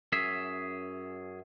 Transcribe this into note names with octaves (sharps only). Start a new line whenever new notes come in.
F#2 C#4 G#4 E5